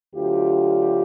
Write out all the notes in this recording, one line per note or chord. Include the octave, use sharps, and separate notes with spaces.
D2 D3 F#3 F4 G4